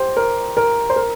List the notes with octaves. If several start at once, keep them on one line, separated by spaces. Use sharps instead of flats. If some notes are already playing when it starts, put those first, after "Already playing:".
Already playing: G4 C5
A#4
A#4
C5
A#4